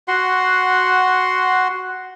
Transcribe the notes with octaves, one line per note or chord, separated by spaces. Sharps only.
F#4 F#5 C6